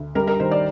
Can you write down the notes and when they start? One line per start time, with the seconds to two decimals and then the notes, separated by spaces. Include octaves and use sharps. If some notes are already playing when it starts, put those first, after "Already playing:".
Already playing: D2
0.15 G3 A#4
0.27 A#4
0.40 D#3 C5
0.51 D5